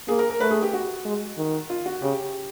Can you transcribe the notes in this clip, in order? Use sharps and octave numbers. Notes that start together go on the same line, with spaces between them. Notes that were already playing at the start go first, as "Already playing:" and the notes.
A#3 G#4
A#4
A#4
A3 B4
G#4
G4
F#4
G#3
D#3
F4
F#4
C#3 G4